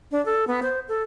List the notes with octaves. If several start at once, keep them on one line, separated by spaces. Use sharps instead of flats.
D4
A4
B3
C5
A4